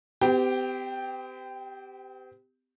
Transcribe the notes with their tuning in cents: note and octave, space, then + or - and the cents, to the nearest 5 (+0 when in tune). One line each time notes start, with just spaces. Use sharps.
C4 -45 G4 +0